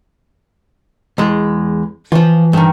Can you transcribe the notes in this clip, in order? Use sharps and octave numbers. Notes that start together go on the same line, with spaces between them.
E2 G#3
E3 F3 F4
G2 D#3